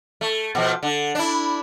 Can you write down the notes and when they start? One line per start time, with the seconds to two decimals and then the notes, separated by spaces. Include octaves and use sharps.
0.21 A3
0.55 B2 F3
0.83 D3
1.15 D4 E4